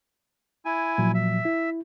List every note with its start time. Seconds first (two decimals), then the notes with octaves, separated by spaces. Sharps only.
0.65 E4 G#5
0.98 A#2 F3 F#3
1.14 E5
1.45 E4